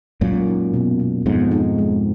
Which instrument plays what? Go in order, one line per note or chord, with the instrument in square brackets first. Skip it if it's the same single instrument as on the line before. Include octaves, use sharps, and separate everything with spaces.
[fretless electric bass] F#2 A#2 [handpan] G#3
[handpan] D#4
B2
B2
[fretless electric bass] F2 G#2 [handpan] B3
[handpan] D#4
G#3